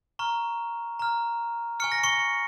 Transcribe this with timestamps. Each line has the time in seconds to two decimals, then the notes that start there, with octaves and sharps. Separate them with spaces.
0.19 A#5 C#6 F6
0.99 A#5 F6
1.80 G#5 C#6 F6 C#7
1.92 A#6
2.03 C#6 C#7